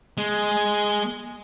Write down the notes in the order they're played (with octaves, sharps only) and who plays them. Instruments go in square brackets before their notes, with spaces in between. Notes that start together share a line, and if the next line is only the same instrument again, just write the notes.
[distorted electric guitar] G#3